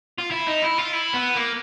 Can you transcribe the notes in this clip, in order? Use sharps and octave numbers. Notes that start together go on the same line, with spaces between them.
F4
E4
D#4
E4
F4
E4
B3
A#3